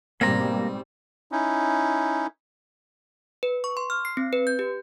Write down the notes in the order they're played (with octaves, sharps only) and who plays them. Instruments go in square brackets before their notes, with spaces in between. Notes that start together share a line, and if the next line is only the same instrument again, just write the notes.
[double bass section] G#2 B2 G3 [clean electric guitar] A#3 A#5 [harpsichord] C4
[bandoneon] C#4 D#4 E4
[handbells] B4
C#6
C6
F6
C7
C4
B4
G6
G4